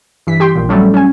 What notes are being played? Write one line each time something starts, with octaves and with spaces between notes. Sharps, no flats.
G2 E3 B6
G4 G5 C6
A#1 A#2
F#3 G3 A3 C#4
C#4 G#5